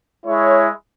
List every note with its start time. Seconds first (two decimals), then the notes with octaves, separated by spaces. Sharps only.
0.25 G#3 E4 C#5